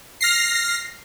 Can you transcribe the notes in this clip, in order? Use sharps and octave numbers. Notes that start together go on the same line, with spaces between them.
F6 A#6 C7